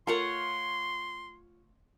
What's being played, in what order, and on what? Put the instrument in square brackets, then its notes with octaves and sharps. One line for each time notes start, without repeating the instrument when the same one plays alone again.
[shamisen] A3 A#4 [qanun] F4 C#5 F#5 [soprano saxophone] C6